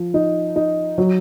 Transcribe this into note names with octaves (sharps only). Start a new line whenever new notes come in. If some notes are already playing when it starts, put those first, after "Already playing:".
Already playing: F3
D#4
D#4
F#3